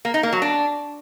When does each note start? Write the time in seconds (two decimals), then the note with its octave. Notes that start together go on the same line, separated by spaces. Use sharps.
0.05 A#3
0.14 D#4
0.23 A#3
0.33 F#3
0.42 D4